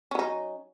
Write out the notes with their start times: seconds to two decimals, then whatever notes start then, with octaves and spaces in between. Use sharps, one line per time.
0.11 C#4
0.15 F#3
0.19 D#4